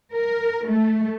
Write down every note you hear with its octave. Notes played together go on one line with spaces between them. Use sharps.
A#4
A3